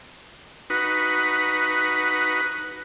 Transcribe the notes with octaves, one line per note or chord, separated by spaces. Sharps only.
D#4 F#4 B4